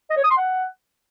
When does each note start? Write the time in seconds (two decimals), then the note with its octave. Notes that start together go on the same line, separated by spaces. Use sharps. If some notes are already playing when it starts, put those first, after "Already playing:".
0.10 D#5
0.17 C#5
0.24 D#6
0.30 C6
0.37 F#5